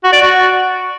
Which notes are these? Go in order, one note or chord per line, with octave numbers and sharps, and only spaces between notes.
F#4
D5
F#4